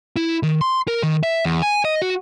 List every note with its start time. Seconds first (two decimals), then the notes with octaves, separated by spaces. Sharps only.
0.16 E4
0.43 D#3
0.61 C6
0.88 A#4
1.03 D#3
1.23 E5
1.45 E2
1.62 G#5
1.85 D#5
2.02 F#4